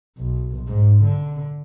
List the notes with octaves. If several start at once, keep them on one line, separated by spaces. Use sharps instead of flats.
B1
G#2
D3